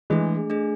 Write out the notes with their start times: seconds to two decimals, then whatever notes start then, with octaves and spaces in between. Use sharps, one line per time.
0.10 E3 G#3 A3 D4 G#4
0.50 A3 D4 G#4